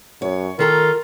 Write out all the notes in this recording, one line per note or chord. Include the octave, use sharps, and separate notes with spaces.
F#2 C#5
D#3 F4 A4 A#4 A#5